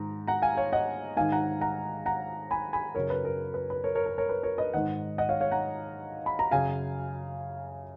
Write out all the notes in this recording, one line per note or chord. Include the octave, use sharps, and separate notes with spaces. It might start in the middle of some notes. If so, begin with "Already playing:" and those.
Already playing: G#2 D#3 A#5
F#5 A#5
F5 G#5
C#5 F5
D#5 F#5
G#2 D#3 F5 G#5
F#5 A#5
F#5 A#5
F#5 A#5
G#5 B5
G#5 B5
F#2 C#3 A#4 C#5
B4
A#4
B4
B4
A#4 C#5
A#4 C#5
A#4
A#4 C#5
B4
A#4 C#5
B4 D#5
G#2 D#3 D#5 F#5
D#5 F#5
C#5 F5
C#5 F5
F#5 A#5
B5
A#5
F#2 C#3 F5 G#5